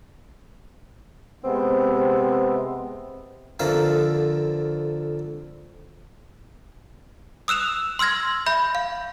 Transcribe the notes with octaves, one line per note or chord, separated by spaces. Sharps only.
C3 G#3 B3 C4
F2 D3 A#4 E5 F5
D#6 E6 F#6 E7 F7
C6 E6 F6 G#6 A#6
E5 B5 G6
F5